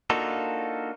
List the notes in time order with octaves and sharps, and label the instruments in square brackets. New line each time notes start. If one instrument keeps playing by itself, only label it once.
[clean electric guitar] A#3 D4 D#4 F4 F#4 A4